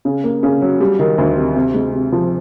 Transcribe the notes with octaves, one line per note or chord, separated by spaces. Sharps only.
C#3
A#3
C#3
F#3
G3
D#3
D2
C3
C3
G#3
C3
F3